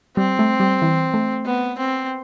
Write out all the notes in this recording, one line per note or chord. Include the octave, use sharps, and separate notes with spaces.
G3 C4
A3
G3
E3
A3
B3
C4